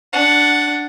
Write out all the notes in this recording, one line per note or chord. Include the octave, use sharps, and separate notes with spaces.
D4 F#5